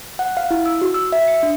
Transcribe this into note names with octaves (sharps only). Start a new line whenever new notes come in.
F#5
F5
E4
E6
F#4
E6
E5
C#7
D4